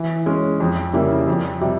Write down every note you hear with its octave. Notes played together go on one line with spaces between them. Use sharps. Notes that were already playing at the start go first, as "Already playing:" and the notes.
Already playing: E3
G#3 C#4
F2
C#3 G3 A#3 E4
F2
C3 G3